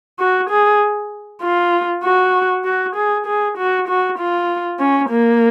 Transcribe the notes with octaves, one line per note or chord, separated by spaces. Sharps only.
F#4
G#4
F4
F#4
F#4
G#4
G#4
F#4
F#4
F4
C#4
A#3